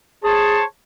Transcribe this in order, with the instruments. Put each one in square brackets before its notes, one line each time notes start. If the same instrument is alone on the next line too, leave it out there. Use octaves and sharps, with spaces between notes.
[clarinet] G#4 [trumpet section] C5 C#5 A5